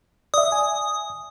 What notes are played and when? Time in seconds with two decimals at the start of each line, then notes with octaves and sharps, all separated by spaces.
0.34 D5 E5 D#6
0.52 G#5